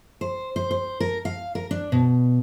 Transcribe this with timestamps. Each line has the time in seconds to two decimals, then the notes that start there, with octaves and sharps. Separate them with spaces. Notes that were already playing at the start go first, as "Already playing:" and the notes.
0.21 C5
0.56 C5
0.71 C5
1.00 A#4
1.25 F5
1.55 A#4
1.71 D4
1.92 B2